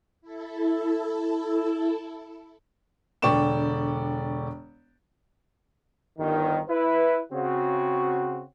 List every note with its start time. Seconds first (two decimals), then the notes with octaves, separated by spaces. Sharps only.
0.21 E4 A4
3.22 E1 D3 D5 G5 C#6 E7
6.18 G1 D#3
6.69 E4 B4
7.32 C#3 C4 F#4